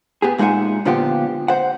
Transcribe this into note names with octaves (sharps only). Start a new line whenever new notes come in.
B3 G4 G#4
A#2 G#3 D#4 E5 F#5 G#5
A#2 D3 F3 B3 F4 G4
C5 F#5